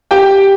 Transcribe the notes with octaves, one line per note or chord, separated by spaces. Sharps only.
G4 G5